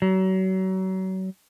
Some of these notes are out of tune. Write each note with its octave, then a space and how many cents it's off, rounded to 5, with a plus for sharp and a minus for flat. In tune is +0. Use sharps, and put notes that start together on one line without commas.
F#3 +35